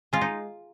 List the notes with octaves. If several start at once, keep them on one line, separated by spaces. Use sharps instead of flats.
G#3 F4
D#4